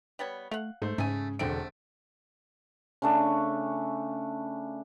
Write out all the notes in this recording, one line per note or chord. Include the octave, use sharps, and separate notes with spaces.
G3 B3 C#5
A3 F5 F#5
G#2 A3 C5
G#2 C#3 A3 G#5
E1 D3 A3 C4 D7
C#3 A3 D4